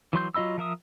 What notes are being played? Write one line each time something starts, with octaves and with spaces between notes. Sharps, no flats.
E3 F#3 C6 G6
F#3 F4 D#5 B5 E6
F3 A#4 E5 D#6